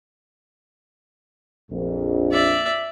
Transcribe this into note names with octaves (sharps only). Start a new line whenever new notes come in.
A#1 F2
D5 E5